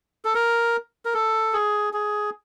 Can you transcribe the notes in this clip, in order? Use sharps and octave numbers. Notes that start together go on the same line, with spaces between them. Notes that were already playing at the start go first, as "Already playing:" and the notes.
A4
A#4
A#4
A4
G#4
G#4